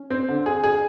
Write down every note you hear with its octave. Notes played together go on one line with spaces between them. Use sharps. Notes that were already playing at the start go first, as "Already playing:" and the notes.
Already playing: C#4
C4
D3
G#4
G#4